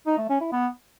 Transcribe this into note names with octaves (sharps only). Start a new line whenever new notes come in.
D#4
A3
C#4
E4
B3